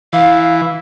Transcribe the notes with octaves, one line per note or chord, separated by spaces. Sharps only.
E3 F5